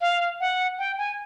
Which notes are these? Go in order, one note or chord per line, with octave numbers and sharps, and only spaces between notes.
F5
F#5
G5
G#5